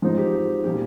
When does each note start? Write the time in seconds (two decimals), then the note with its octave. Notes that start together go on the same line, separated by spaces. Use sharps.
0.02 G#2 F3 C4 D#4 F4
0.18 G4
0.64 A#2 G3 A#3 G4